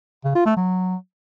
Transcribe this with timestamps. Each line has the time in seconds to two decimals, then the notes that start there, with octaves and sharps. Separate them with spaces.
0.25 C#3
0.35 F4
0.46 A3
0.57 F#3